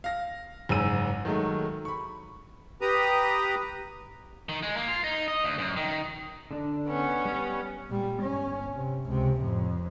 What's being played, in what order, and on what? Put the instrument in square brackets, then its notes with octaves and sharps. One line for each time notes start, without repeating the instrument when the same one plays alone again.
[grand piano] F5 A#6
F#1 G#2 G#4 E6 D#7
D#3 F#3 G#3 A3
B5 C#6
[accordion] G4 B4 A#5 D#6
[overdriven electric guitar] D#3
G#3
A#3
F4
D#4
D#5
D2
F#2
D#3
[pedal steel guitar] D3 D4
[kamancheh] B3 C#4
[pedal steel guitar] G3
[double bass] A#2 G3
G1 C#4
C3
C#2 C3
F2 A2